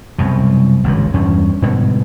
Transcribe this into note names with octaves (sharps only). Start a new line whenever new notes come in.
C2 F#2 B2
G#1 C#2 G2
E2 G2 C#4
G#2 B2 D3 G3